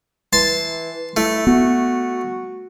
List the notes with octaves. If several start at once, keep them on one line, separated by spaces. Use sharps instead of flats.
E3 A5 C6
A3 E4
B3 F#4